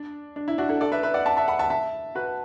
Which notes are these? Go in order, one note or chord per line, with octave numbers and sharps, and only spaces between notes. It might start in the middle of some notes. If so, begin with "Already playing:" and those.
Already playing: D4
D4
E4
D4 F#4
E4 A4
A4 D5
B4 E5
B4 E5
D5 F#5
E5 A5
E5 A5
F#5 B5
E5 A5
E5 A5
F#4 B4